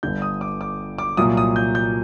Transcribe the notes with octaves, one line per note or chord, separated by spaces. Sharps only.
G1 G2 D3 G6
D#6
D6
D6
D6
C2 A#2 F#3 A#3 D#6
D#6
G6
G6